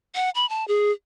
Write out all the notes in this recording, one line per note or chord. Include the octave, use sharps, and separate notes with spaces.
F#5
B5
A5
G#4